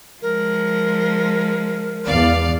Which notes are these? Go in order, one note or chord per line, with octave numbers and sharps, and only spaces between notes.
F3 G#3 A#4
E2 D5 F5